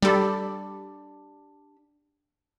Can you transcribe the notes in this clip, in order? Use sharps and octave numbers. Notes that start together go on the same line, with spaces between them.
G3 D4 G4 A4 B5